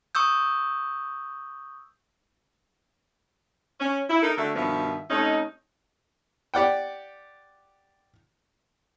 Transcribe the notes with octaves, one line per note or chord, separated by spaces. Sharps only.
C#6 D#6 E6 G6
C#4
E4
D#4 A4 A#4
D3 A3 F#4 A4 E5
G2 B2 D#3 F3 B3 E5
C3 A3 C#4 D#4
G4 D5 F#5 G5